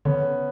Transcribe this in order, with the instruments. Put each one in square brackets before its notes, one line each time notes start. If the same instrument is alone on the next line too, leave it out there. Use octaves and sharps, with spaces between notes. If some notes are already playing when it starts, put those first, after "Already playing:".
[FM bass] D3 [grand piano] B3 C#4